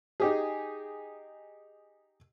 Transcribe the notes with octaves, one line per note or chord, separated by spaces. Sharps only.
D#4 G4 G#4